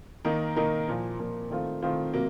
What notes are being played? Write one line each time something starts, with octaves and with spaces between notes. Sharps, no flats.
D#3 A#3 D#4 A#4
D#3 A#3 D#4 A#4
A#2 F3 A#3
A#2 F3 A#3
D#3 A3 C4 F4
D#3 A3 C4 F4
C3 F#3 A#3